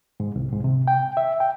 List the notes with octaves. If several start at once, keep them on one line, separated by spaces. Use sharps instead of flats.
G#2
C2
G#2
C3
G5
E5
G5